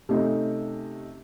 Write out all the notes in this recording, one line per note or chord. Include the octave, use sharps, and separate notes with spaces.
C3 A3 C#4 D#4